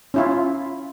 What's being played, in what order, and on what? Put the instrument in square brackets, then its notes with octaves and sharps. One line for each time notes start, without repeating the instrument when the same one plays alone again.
[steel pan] C#4 E4 F4